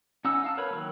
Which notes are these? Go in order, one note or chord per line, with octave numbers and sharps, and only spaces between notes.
C#4 D#4 F#5 E6
F5 A5 E6
A#4 B4 C#5 B5
D#3 F#3 A#3